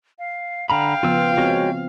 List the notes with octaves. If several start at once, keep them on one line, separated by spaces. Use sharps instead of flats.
F5
D3 F5 G5 A#5 B5
C#3 F3 B3 F4 E6
G#3 C4 F#4 C#5